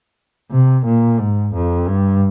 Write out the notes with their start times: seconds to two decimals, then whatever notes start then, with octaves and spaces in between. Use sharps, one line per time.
0.51 C3
0.85 A#2
1.19 G#2
1.54 F2
1.88 G2